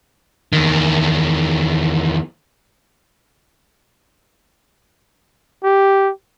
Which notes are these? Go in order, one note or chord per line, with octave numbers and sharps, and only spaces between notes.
E2 D#3
G4